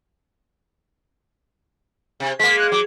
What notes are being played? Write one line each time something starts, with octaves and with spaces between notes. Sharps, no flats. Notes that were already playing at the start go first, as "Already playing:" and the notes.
C3
G#3 A#3 B6
F#6
F#3 D6